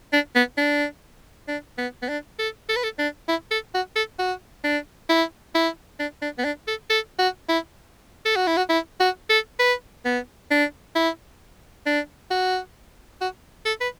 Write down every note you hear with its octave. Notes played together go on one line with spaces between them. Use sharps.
D4
B3
D4
D4
B3
B3
D4
A4
A4
B4
A4
D4
E4
A4
F#4
A4
F#4
D4
E4
E4
D4
D4
B3
D4
A4
A4
F#4
E4
A4
F#4
E4
F#4
E4
F#4
A4
B4
B3
D4
E4
D4
F#4
F#4
A4
B4